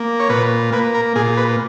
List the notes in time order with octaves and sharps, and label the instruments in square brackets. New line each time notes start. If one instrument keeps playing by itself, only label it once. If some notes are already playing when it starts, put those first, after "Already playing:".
Already playing: [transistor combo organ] A#3
C#5
A#2 B4
A#3 B4
A#4
A#2 G#4
B4